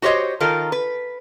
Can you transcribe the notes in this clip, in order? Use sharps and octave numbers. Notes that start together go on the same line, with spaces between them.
F#4 G4 C5 C#5 D#5
D#3 F4 A4 A#4
B4